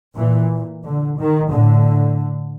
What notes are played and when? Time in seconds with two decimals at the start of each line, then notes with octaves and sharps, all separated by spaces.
0.17 A#2 E3
0.84 D3
1.17 D#3
1.51 A2 D3